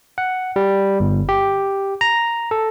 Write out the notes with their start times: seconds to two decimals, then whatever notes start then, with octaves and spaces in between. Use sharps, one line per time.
0.18 F#5
0.56 G3
1.00 G1
1.29 G4
2.01 A#5
2.51 A4